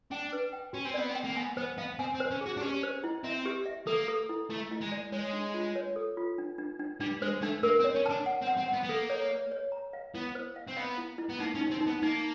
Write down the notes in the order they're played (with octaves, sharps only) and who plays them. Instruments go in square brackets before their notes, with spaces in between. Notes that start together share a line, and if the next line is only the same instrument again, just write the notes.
[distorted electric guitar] D4 [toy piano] G5
[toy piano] B4
G5
[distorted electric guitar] C#4 [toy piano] F#4
[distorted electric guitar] C4
[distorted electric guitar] B3 [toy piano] D5
[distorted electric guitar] C4
[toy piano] G5
[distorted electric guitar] A#3
[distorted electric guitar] B3 [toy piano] G#5
[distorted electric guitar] B3 [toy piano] C5
[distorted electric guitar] B3 [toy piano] F5
[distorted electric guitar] C4 [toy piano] G#5
[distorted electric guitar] C4
[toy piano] C5
[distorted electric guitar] C#4
[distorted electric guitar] F#4 [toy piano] G#4
[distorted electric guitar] D4
[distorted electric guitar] C#4 [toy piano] G4
[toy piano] C5
E4
[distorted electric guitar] C4 [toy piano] E5
[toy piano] G4
E5
[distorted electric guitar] A#3 [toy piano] A4
[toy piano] A4
E4
[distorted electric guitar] A3 [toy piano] E4
[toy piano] E4
[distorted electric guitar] G#3
[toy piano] D5
[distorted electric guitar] G#3 [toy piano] C#5
[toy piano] D4
F4
C#5
A4
F4
D4
D4
D4
[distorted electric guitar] G3 [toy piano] D4
[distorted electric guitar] G#3 [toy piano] C5
[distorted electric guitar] A3 [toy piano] D4
[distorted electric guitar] A#3 [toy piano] A#4
[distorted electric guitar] C4
[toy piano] C#5
[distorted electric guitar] C#4
[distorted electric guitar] D4 [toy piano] A5
[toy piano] F#5
[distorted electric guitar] C4
[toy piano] F#5
[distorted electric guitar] C4
[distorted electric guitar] B3 [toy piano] F#5
[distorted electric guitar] B3
[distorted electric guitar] A#3 [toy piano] A4
[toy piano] C#5
C#5
C#5
A#5
F5
[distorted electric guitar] B3 [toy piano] E4
[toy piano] C5
F5
[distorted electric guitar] C4
[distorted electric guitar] B3 [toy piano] F5
[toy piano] E4
E4
[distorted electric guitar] B3
[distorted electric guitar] A#3 [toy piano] D#4
[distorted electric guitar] C#4
[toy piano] D#4
[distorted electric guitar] C4
[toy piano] D#4
[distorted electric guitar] B3
[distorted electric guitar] A#3 [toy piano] D#4